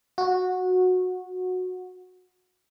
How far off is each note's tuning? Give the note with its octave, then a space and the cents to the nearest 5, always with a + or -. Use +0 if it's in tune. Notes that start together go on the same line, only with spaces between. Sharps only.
F#4 -15